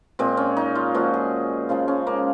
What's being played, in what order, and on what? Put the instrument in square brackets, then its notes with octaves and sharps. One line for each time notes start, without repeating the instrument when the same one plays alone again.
[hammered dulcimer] A#2 G#3 C4
C#4
D#4
F4
A#2 F3 G#3 F#4
G#4
C#3 F3 G#3 F4
C#4
A#3